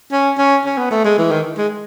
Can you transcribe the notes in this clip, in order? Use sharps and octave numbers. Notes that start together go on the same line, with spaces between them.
C#4
C#4
C#4
B3
A3
G#3
E3
D#3
G#3